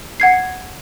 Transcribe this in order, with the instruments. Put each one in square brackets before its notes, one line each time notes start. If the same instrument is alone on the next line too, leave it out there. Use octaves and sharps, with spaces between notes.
[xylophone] F#5 G#6 C7